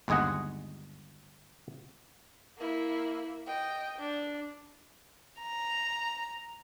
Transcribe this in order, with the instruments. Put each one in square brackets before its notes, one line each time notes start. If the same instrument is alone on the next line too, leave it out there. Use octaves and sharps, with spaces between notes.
[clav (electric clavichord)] G1 D#2 G#3 G#4 D#5 F#5
[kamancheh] A#3 E4
D#5 G5
D4
[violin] A#5